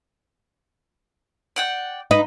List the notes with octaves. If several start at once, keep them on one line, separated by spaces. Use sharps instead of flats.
D5 F#5 G5
D#4 B4